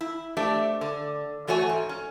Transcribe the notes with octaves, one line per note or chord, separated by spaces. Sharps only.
E4
A3 D4 G4 C5 E5
D3
E3 A3 F#4 C#5 G#5
G#2
C#4